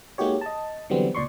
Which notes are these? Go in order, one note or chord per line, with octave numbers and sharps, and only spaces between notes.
G#3 A#3 D#4 F#4 G4 C#5
D#5 A5
D3 E3 F#3 G3 B3 C4
C#2 A#2 D5 C6 C#6